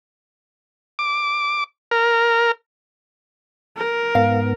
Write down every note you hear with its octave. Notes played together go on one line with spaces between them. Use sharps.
D6
A#4
A#4
G#2 B3 F5